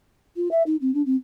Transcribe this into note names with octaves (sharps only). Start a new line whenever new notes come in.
F4
E5
D#4
C4
D4
C4